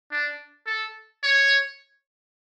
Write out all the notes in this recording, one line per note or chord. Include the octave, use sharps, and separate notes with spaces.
D4
A4
C#5